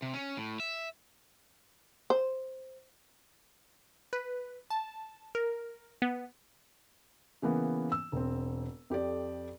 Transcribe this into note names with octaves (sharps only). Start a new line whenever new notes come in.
C3
C#4
A2
E5
C5
B4
A5
A#4
B3
C#3 E3 A#3 B3
E6
E1 C4
F2 G4 A4 D5